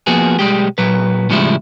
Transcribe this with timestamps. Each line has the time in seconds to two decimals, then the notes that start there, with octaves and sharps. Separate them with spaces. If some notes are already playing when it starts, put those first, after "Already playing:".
0.07 F3 A#3 B3 F#4 G#4
0.39 B1 G3 G#3 G4
0.78 A#2 F#3 B4
1.30 A2 C#3 F3 G3 G#3 E4